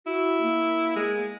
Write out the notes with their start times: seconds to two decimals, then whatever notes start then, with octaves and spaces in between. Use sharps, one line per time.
0.07 E4 F#4
0.42 A#3
0.96 G#3